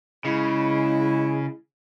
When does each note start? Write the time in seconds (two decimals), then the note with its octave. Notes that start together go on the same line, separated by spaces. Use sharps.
0.25 C#3 G#3 E4